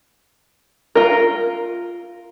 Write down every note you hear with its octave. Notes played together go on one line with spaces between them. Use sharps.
F4 A#4